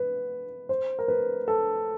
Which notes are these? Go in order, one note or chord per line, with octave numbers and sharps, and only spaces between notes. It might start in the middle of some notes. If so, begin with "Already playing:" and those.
Already playing: B4
C5
A#4
B4
A4